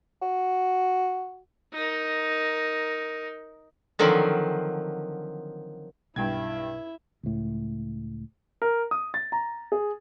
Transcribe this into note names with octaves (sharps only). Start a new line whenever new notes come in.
F#4
D#4 A#4
D3 D#3 F3 F#3 C4
B1 G2 E4 E5 G5 G#6
C#2 A2
A#4
D#6
A6
A#5
G#4